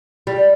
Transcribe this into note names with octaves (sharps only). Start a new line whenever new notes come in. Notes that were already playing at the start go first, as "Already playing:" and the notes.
G3